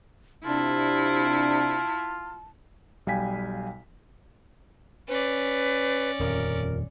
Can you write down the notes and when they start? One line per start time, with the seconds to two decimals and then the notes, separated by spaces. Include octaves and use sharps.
0.45 C3 D4 E4 F4 A5
3.07 B1 G3 F5 G5 G#5 B6
5.08 C#4 B4 D5
6.19 D#1 F2 A#4